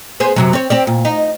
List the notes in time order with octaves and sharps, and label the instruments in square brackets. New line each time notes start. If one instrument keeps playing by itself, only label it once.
[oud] B3 G#4 C5
F#2 C3 F#3
C4 C#5
C4 G4 D5
A#2
D#4